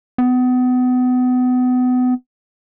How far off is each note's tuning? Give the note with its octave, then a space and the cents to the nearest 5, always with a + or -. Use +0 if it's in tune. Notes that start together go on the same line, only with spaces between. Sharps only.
B3 +30